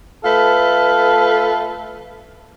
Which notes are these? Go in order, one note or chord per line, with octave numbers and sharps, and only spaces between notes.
A3 F4 A4 B4